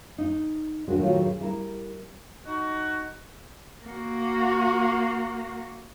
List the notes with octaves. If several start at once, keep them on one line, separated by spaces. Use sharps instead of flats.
D#4
D#2 G#3 D4 F#4
A2 D#3 F#3 D#4 F4 G4
G#4
G3 E4 A#4
D#4 F#4
A#3 F#4